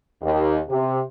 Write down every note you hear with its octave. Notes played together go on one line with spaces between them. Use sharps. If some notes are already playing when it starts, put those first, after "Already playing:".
D#2
C3